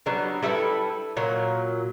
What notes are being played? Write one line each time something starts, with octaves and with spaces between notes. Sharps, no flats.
F#3 G3 B3 D4
G3 E4 A4 B4
A#2 F#3